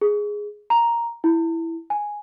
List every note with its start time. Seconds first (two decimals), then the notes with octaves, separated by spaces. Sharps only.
0.01 G#4
0.70 A#5
1.24 E4
1.90 G#5